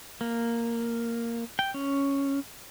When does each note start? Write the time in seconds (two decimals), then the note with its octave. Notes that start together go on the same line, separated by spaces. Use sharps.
0.21 A#3
1.59 G5
1.74 C#4